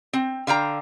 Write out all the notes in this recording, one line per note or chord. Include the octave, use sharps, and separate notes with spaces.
C4
D3 F5 G5 A#5